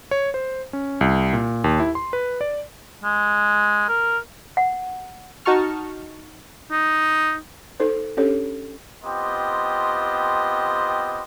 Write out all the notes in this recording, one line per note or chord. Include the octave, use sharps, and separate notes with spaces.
C#5
C5
C#4
C2
A#2
D#2
E4
C6
B4
D5
G#3
A#4
F#5
D#4 F#4 A5 C#6 F6
D#4
D#4 A4 C5
C#4 D4 G4 A4 C#5
B3 C4 F4 G4 D#5 C6